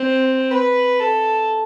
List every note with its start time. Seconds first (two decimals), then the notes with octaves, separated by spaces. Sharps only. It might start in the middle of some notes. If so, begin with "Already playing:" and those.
Already playing: C4
0.51 B4
1.00 A4